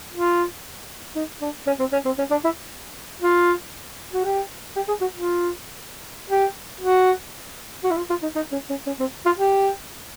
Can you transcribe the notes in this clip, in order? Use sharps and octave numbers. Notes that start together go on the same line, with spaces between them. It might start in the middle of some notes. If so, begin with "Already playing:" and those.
F4
D#4
D4
C#4
C4
C#4
C4
C#4
D4
E4
F4
F#4
G4
G4
G#4
F#4
F4
G4
F#4
F#4
E4
F4
F4
D#4
D#4
C#4
C#4
C#4
C4
F4
G4